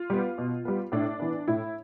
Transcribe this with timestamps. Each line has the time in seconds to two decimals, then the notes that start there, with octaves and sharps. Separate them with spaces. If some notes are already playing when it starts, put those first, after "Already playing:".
Already playing: F4
0.10 G3 B3
0.38 B2
0.65 G3 B3
0.92 A2 D4
1.20 E3 B3
1.48 A2 E4